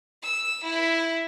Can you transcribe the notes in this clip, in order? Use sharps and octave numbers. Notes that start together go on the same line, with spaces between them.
E6
E4